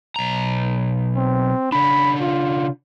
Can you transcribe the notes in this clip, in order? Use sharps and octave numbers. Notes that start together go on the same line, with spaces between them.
B1 A#5
C4
C#3 D4 B5
F4